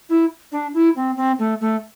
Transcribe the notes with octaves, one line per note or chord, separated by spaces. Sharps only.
E4
D4
E4
C4
C4
A3
A3